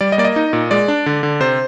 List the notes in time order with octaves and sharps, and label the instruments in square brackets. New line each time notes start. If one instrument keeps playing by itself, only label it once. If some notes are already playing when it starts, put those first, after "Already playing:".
[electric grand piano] G3 D5
D#5
A#3 D5
D#5
D#4
A#2
G#3 D5
D4
D3
D3
C3 C5